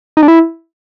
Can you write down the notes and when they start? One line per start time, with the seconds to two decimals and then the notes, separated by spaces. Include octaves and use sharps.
0.17 D#4
0.23 D4
0.28 E4